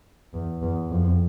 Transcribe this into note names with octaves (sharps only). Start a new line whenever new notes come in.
E2
E2
F2